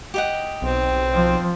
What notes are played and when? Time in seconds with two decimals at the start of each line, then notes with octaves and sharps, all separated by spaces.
0.14 G4 D#5 F#5
0.62 B1 C4
1.14 F3